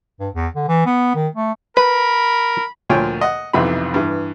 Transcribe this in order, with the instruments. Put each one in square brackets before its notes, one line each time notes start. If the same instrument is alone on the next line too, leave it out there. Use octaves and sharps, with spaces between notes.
[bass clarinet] G2
E2
D3
E3
B3
D#3
A3
[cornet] A#4 [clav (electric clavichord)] B4 [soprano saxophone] B5
[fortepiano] D2 A#2 F3 C#5 G5 G#5
D#5 F#5
B1 F2 C3 E3 D#4 B5
G2 E3